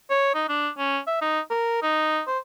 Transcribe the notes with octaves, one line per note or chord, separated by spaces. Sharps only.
C#5
D#4
D4
C#4
E5
D#4
A#4
D#4
C5